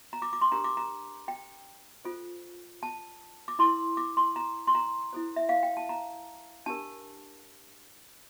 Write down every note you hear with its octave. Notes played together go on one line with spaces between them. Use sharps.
A#5
D6
D6
C6
D4 G4 A#4 A#5
D6
A#5
G5
F4 A4 C5
A5
D6
E4 A#4 C6
D6
C6
A#5
C6
A#5
E4 A4 C5
E5
F5
G5
A5
A#5
D4 G4 A#4 A5